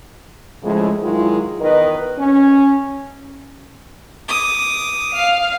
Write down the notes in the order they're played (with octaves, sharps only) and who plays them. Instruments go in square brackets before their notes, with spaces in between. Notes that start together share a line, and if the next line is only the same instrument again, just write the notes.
[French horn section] A2 C#3 F3 G#3
G#2 D#3 F#3 G#3 E4 F4
E2 D#3 A#4 B4 D#5
C#4
[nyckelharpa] D6 D#6
[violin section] F5